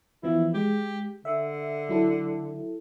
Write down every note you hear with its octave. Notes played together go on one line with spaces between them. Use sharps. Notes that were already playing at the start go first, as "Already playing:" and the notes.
E3 F3 B3 E4
G#3 G4
D3 E5
F#3 E4 A4